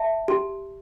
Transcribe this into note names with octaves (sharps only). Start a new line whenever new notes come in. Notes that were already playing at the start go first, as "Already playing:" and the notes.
Already playing: E5 A5
G4